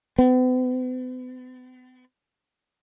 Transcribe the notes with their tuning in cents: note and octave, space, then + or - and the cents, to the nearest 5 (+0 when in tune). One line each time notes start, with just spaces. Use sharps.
B3 +45